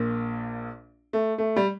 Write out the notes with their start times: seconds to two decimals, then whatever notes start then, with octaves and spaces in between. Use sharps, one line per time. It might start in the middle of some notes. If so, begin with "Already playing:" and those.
Already playing: A#1 A#2 A#3
1.13 A3
1.38 A3
1.56 G3